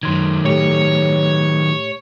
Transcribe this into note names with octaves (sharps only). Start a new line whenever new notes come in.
F#2 D#3 F#3 C6 G#6
A2 A3 G4 C#5